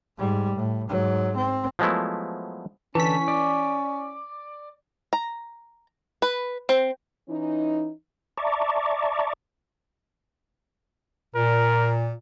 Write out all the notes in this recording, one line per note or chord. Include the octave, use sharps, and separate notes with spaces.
G#2 G3
A2
G#2 F#3
C4
F3 F#3 G#3 A3 B3 E4
D3 E3 C#4 A5 B6
D5
A#5
B4
C4
E3 C#4 D#4
D5 E5 A5 A#5 C#6 D6
A#2 A#4